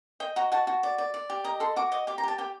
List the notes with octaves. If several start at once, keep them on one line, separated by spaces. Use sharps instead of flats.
D#5 G5
F#4 A#5
F#4 A5
F#4
D5
D5
D5
G4
D#5 A#5
A4 C6
F#4 D6
D#5 D6
G4 D6
A#5
G4 A5
G4 G5